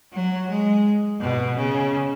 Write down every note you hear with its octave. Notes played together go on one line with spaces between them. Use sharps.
F#3
G#3
B2
C#3